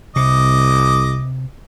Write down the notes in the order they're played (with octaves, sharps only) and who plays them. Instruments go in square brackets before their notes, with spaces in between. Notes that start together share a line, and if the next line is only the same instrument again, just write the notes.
[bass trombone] C2 [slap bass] C3 [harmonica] D#5 D6